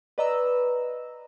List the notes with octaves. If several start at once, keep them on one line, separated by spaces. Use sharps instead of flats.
B4 D5 D#5 A#5 E6